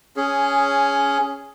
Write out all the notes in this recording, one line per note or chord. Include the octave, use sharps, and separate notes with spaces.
C#4 G#4